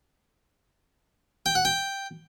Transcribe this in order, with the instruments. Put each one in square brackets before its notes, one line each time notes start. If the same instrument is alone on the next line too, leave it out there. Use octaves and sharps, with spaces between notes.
[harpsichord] G5
F#5
G5